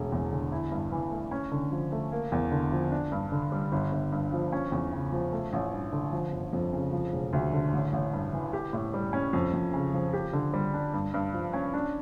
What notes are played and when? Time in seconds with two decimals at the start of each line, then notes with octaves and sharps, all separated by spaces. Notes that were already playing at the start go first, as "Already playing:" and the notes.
Already playing: E1 A3
0.12 E2
0.31 D3
0.52 E4
0.72 G2
0.92 E3
1.11 A3
1.31 C#4
1.51 D3
1.72 F3
1.92 A3
2.12 A#3
2.32 E2
2.52 D3
2.72 F3
2.91 D4
3.12 G2
3.32 D3
3.52 G3
3.72 G1
3.92 G1
4.12 G2
4.32 F3
4.52 C#4
4.72 E2
4.92 C#3
5.12 F3
5.32 A3
5.53 A1
5.72 G2
5.92 D3
6.12 F3
6.32 G1
6.53 F2
6.73 C#3
6.93 F3
7.13 E1
7.33 D2
7.53 D3
7.73 A1
7.93 A1
8.13 G2
8.33 E3
8.53 G4
8.73 A2
8.94 G3
9.13 C#4
9.33 F2
9.53 F2
9.73 C#3
9.94 F3
10.13 G4
10.33 D3
10.53 G3
10.74 D4
10.94 G2
11.14 G2
11.33 F3
11.53 C#4
11.73 D4